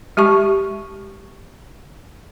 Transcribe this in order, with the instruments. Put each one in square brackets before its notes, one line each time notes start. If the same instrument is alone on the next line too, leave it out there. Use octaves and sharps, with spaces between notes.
[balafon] G#3 G4 A5 C#6